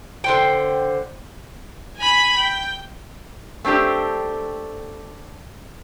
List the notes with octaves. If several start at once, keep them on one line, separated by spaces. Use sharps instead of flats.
D3 C5 G5
G#5 B5
G5
A3 C4 D4 G4